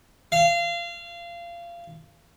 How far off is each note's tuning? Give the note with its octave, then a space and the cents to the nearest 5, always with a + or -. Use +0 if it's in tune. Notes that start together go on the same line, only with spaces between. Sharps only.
F5 -25